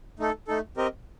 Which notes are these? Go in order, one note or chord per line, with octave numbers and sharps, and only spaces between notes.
A3 D#4 A4
A3 D#4 A4
C4 G4 A#4 D#5